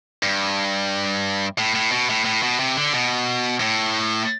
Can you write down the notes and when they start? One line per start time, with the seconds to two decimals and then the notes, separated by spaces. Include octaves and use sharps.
0.23 G2
1.58 A2
1.75 A2
1.92 B2
2.10 A2
2.25 A2
2.43 B2
2.59 C3
2.77 D3
2.93 B2
3.61 A2